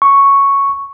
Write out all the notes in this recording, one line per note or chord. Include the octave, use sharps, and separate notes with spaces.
C#6